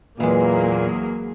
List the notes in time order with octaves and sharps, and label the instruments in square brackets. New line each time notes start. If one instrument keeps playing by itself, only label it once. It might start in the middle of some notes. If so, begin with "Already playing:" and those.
[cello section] E2 F#3 G#4 [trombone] A#2 [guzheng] E3 G#3 [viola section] A#3